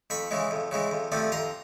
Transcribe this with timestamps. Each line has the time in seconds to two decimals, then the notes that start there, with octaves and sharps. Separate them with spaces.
0.10 F2 B5 C#6
0.31 C#3 E3 G#3
0.51 F2
0.71 C#3 E3 G#3
0.91 F2
1.12 C3 F3 A3 D4
1.32 F2 A#5 C6